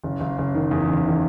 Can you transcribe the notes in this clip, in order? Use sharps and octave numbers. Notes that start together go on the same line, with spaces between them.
F#1
F#1
F#1
D#3
E2
F#1
D#3